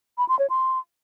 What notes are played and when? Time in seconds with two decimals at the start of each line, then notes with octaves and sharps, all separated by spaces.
0.18 B5
0.29 C6
0.39 C#5
0.50 C6